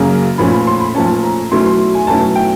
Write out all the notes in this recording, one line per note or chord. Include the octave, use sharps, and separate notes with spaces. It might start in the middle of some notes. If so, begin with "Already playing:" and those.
Already playing: F#2 C#3 F#3 A#3 C#4
A#2 F3 A3 C#4 B5
B5
C6
B5
A#2 F3 A3 C#4 A5
A#5
B2 F#3 A3 C#4 E4 C6
C6
G#5
B2 F#3 A3 C#4 E4 A5
G5